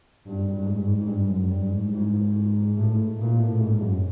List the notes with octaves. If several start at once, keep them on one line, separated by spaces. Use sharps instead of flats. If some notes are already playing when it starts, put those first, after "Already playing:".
G2
G2
G2
G#2
G2
G#2
G#2
G2
F#2
G2
G#2
G#2
A2
A#2
A2
G#2
F#2